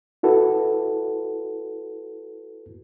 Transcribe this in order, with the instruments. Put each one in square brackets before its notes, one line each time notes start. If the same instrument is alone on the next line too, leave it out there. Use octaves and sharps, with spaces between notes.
[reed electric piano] E4 F#4 A4 B4